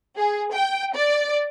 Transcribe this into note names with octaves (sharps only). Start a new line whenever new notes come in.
G#4
G5
D5